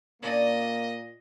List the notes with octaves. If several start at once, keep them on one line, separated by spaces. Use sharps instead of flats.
A#2 A#3 C#4 D4 D5 D#5